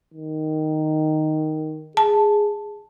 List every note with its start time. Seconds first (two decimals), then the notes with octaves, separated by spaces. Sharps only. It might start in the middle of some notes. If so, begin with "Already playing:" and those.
0.14 D#3
1.97 G#4 A5